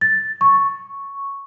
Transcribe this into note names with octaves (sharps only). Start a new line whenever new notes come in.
A6
C#6